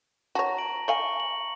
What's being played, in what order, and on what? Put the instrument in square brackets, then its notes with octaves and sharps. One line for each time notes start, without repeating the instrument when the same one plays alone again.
[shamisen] F#4 C#5 [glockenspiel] A5 A#5 A#6
[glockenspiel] A#6 D7 F#7
[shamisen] D#5 F5 G#5 [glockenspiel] C#6 C#7 F#7
[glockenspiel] F#7